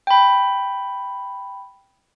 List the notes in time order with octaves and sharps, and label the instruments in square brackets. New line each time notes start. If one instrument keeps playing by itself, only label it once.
[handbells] G5 B5